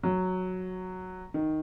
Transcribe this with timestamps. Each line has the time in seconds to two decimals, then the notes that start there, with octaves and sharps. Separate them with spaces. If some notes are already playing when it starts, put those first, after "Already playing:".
0.03 F#3
1.34 D#3